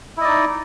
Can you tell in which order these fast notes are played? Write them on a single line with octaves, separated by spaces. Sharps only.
E4 D#5 D5 D#4